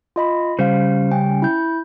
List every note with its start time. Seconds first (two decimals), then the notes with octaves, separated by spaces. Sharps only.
0.16 F4 D#5 B5
0.59 C#3 G3 C5 F5
1.12 C#4 G5
1.42 E4 G6